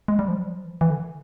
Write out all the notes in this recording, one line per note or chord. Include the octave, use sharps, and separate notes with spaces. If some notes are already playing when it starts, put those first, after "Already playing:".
G#3
G3
F3
F#3
F3
E3
F3
E3
D3